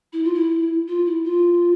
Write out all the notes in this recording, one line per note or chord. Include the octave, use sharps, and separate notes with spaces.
E4
F4
E4
F4
E4
F4